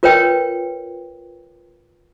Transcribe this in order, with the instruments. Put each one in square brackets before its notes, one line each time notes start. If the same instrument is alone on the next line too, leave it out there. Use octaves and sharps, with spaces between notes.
[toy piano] F4 A#4 B4 C#5 G5